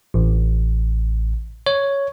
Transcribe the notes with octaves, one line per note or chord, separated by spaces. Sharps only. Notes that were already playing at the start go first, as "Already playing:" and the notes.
A1
C#5